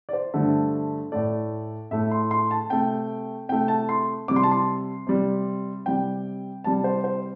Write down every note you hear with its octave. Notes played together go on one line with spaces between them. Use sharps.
D5
C5
G2 D3 A3
A2 A3 D5
A2 A3 E5
C6
C6
A5
C3 A3 G5
C3 A3 G5
A5
C6
C3 G3 D6
C6
A5
C6
C3 G3
C3 G3 G5
C3 G3 A5
C5
C5